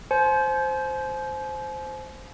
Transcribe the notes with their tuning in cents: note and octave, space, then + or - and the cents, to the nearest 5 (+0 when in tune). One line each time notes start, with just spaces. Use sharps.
C5 +0 G#5 +45